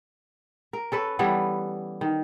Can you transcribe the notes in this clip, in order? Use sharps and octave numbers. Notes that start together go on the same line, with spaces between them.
A#4
C#4 A4 B4
E3 G3 B3 A4
D#3